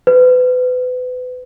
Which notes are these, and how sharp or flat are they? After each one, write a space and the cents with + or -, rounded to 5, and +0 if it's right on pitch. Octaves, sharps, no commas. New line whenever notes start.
B4 +30